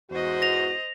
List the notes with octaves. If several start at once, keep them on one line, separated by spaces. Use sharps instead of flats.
E2 G#2 F#4 C5 D#5
A#6 F7